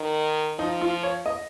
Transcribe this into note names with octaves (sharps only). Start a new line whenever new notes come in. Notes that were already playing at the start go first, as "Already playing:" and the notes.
Already playing: D#3
F3 D#4
F4
C#5
D#5